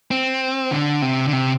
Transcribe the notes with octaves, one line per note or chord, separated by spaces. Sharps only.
C4
D3
C3
D3
C3